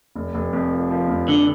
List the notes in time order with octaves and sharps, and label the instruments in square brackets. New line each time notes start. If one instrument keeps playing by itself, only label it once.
[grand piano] F1
F1
F2
F3
F3
F1
[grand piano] F2 [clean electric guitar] D3